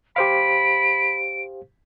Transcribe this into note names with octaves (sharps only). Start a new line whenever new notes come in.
G4 C5 F5 B5 D7